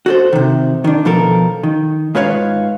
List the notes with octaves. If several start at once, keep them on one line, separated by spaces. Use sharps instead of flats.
F#4 A4 C5
C3 D#3
D#3 D4
B2 F3 A4 A#4
D#3
G#2 F4 B4 C#5 F5